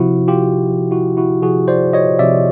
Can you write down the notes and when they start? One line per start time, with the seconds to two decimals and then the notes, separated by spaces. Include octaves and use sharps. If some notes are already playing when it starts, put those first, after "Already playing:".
Already playing: C3 F3 E4 F#4
0.28 F4 G4
0.66 C3 F3
0.91 E4 F#4
1.17 E4 F#4
1.42 C3 F3 F#4 G#4
1.68 C5 D5
1.93 C#5 D#5
2.19 C3 F3 D5 E5